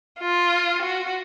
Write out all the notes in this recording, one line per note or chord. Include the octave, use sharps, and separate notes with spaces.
F4
F#4